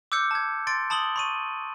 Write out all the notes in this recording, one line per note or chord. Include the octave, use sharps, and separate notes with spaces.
D6 E6 F#6 G6 C#7
A5 G#6
C6 A6 D7
A5 B5 D#6 F#7 G7
B5 C#6 D#7